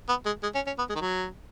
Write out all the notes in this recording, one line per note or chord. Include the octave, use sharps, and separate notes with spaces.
B3
G#3
G#3
C#4
C#4
B3
G#3
D#3
F#3